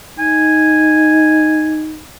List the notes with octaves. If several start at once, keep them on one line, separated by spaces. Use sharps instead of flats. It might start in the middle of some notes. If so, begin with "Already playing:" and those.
D#4 G#5